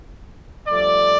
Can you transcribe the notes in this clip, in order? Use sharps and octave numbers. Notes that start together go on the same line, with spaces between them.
G2 F3 A3 D5